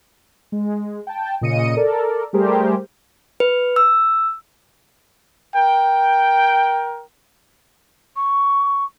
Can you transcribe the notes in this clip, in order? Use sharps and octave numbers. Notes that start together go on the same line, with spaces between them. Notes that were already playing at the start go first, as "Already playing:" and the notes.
G#3
G5 A5
A#2 C#3 D#5 C#7 D#7
A4 A#4 D5
G3 A3 G4 G#4 A#4 C5
B4
E6
A#4 G5
C#6